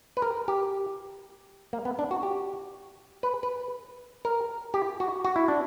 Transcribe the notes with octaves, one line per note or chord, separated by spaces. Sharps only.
B4
A#4
G4
A#3
B3
D4
F#4
G4
B4
B4
A#4
G4
F#4
F#4
E4
D4